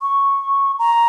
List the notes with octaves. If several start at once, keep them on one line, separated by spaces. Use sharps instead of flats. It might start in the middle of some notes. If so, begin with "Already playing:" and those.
C#6
A#5